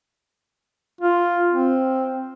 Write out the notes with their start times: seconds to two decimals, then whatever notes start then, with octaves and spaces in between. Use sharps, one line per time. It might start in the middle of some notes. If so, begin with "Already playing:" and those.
1.01 F4
1.51 C4